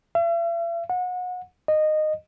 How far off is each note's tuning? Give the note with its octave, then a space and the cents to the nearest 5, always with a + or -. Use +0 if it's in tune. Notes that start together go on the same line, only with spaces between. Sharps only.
E5 +45
F#5 -30
D#5 -15